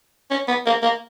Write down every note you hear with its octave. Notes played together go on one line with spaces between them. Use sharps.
C#4
B3
A#3
A#3